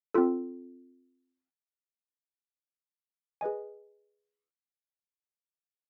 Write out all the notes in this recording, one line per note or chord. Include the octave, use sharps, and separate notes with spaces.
C4 F4 A4
G#4 B4 D#5 G#5